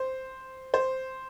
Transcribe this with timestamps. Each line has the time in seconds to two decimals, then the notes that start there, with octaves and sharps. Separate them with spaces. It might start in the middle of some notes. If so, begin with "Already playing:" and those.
Already playing: C5
0.74 C5